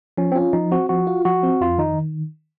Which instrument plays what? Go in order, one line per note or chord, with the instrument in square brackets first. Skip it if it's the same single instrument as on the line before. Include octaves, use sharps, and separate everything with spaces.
[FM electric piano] F3 [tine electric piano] C#4
[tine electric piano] C4
[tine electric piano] C#4 [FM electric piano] F4
[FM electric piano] F3 [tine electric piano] D#4
[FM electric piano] C4 [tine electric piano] F#4
[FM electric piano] F3 [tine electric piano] F#4
[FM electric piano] F4
[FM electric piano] F3 [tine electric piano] F#4
[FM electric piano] C4
[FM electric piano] F2 [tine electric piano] F4
[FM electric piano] D#3 [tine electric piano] D#4